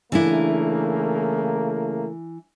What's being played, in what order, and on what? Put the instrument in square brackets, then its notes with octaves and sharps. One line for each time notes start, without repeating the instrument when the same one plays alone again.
[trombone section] C#3 A3 A#3 [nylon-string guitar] E3 D4 E4